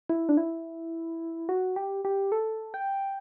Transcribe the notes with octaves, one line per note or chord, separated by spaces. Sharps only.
E4
D4
E4
F#4
G4
G4
A4
G5